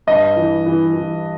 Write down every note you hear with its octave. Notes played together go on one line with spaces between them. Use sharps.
G2 D#5
E3
E3
E3